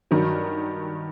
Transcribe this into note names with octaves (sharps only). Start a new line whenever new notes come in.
G2 D#3 F#3